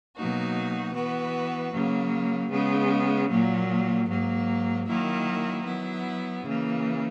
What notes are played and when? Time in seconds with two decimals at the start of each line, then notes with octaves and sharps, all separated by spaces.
0.15 B2 F#3 A#3 D#4 F#4
0.93 E3 B3 F#4 B4
1.72 C#3 F#3 A#3
2.50 C#3 G#3 B3
3.29 A#2 F#3 A#3
4.08 G#2 F#3 A#3
4.86 D#3 F#3 A#3 E4
5.65 F#3 B3 E4
6.44 C#3 E3 A#3